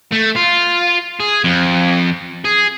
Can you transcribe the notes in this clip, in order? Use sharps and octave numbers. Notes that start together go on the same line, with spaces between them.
A3
F4
G#4
F2
G#4